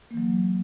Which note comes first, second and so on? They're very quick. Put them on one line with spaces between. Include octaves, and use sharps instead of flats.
A#3 E3 F#3